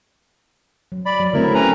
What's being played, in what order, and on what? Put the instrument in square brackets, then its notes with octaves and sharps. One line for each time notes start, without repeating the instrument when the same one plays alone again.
[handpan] F#3
[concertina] D5 B5
[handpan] F#3
[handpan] D3 A3 C4 [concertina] E4 A#4
[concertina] C#4 B4 A#5